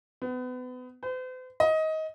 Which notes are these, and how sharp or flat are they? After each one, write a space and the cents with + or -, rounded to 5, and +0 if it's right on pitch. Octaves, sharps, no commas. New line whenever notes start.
B3 +30
C5 -45
D#5 +20